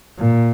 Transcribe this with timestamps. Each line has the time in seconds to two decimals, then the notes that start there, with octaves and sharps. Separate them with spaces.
0.19 A#2